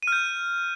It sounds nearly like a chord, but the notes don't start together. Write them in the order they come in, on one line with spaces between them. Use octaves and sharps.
D#7 F6 G6